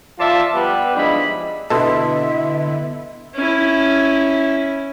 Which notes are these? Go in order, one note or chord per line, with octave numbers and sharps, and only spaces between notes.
F3 F4 D5 E5 A5
G3 B3 G4 B4
G#2 F3 G#3 D4 E4 B5
B2 D3 B3 E4 A4 D#5 E5 C6
C#4 E4